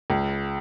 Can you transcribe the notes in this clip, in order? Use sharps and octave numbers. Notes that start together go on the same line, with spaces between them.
C#2